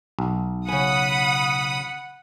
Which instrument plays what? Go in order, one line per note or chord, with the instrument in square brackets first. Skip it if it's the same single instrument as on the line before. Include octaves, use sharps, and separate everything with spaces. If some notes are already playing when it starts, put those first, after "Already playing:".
[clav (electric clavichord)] B1
[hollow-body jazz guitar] C#3 G#5 [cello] F#5 [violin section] B5 D#6